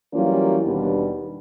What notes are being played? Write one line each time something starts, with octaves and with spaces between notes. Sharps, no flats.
E3 F#3 G3 A#3 C#4 F4
D#2 B2 G3 B3 D4